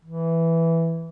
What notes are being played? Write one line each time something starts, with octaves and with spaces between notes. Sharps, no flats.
E3